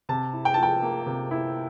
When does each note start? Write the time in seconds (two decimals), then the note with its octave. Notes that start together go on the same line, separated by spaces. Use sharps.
0.09 C3 A5
0.33 E4
0.45 G5
0.54 A5
0.58 F3
0.63 G5
0.83 A#3
1.06 C3
1.31 E4